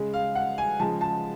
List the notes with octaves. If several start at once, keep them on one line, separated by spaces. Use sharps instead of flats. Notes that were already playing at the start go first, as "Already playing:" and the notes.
Already playing: C#3 G#3
F5
F#5
G#5
C#3 F3 G#3 A5
A5